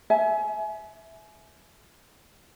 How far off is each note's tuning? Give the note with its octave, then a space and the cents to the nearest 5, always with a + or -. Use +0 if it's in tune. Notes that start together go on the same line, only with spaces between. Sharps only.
E5 -5 G#5 +30